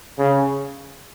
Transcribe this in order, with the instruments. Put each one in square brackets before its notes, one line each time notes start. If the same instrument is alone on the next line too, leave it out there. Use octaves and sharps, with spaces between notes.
[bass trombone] C#3